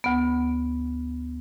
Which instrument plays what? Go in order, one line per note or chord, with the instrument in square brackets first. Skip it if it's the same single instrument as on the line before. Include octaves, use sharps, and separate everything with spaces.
[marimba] D2 B3